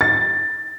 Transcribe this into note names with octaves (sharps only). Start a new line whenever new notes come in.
A6